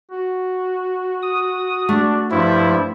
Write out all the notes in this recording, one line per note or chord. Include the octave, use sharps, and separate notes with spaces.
F#4
D#6
A3 D4
G2 F3 E4